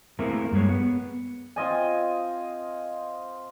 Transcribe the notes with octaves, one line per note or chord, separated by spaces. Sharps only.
A3 A#3 C4 E4 G#4 A#4
G2 G3 G#3 G#4 C#5
B3
C4 F4 D#5 G#5